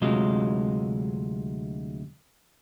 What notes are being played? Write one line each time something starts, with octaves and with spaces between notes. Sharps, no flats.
D2 C3 F#3 G#3 F4 D#5